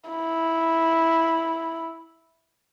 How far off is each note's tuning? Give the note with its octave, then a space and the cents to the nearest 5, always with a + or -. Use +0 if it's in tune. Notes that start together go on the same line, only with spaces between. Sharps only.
E4 -5